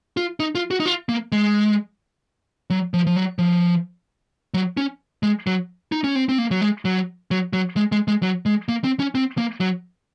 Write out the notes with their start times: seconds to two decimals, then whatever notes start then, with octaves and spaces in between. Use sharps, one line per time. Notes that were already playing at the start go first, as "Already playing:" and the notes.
0.17 F4
0.40 D#4
0.55 F4
0.71 F#4
0.80 D#4
0.86 F4
1.09 A#3
1.32 G#3
2.70 F#3
2.94 F3
3.07 F3
3.16 F#3
3.39 F3
4.54 F#3
4.77 C#4
5.23 G#3
5.47 F#3
5.92 D#4
6.04 C#4
6.15 C4
6.29 C4
6.38 A#3
6.51 F#3
6.61 G#3
6.85 F#3
7.31 F#3
7.53 F#3
7.77 G#3
7.92 G#3
8.08 G#3
8.22 F#3
8.46 G#3
8.69 A#3
8.84 C4
9.00 C#4
9.15 C4
9.38 A#3
9.61 F#3